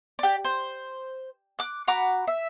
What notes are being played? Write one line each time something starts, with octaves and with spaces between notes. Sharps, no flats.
G4 D5
C5
D6 F#6
F#4 A#5 B5 D6
E5